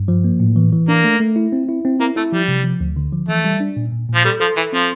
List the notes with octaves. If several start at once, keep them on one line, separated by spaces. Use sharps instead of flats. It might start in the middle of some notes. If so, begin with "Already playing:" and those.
Already playing: G2
F3
A#3
A2
E3
E3
A#3 D4
A3
A3
E4
C4
E4
C4
A#3 E4
A3 E4
F3 G3
C3
F3
D2
D3
F3
E3 A3
G3
D4
A#2
A#2
A#2
F3
G3 A4
F3 A4
E3 A4
F3 C4